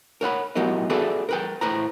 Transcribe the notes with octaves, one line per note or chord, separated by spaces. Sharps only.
A#4 C#5 F#5 B5
A2 F#3 B3 G4 A#4 D#5
F#4 G#4 A4 B4 D5 E5
A#4 B4 G5
A2 B4 C5 A#5